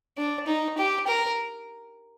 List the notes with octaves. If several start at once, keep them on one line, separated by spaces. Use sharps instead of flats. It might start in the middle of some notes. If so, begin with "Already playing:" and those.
D4
D#4
G4
A#4